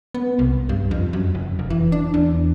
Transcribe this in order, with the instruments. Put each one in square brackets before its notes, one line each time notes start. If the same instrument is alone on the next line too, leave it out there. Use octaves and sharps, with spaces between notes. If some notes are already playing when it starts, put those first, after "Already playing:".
[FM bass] B3
C2
G2
F2
F#2
F#1
F1
E3
D4
E2